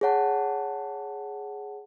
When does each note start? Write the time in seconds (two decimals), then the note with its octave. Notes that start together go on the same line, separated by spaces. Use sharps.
0.01 G#4 C#5 F#5 A5